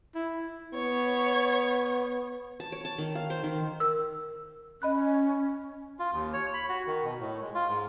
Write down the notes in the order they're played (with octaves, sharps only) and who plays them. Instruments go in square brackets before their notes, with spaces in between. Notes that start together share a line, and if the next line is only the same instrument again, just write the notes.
[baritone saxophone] E4
[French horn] B3 [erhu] C#5
[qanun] A5
C#5
A5
D#3
F5
C5
D#3
[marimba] A#4 E6
[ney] C#4 [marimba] D#5 B5 F#6
[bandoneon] F4
D#2
C#5
B5
F#4
D#3
B2
A2
G#3
F4
G#2